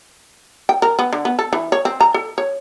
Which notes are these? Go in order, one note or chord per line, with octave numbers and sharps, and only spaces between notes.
G5
A#4
B3
D3
B3
A4
E3
C#5
C4
A#5
A4
C#5